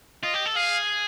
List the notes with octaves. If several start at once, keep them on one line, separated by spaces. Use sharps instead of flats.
F4 D#5
G4
A4
G#4 F5